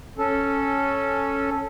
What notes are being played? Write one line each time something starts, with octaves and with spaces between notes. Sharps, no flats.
C#4 A4